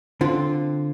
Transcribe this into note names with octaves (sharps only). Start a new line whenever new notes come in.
D3 C4 F4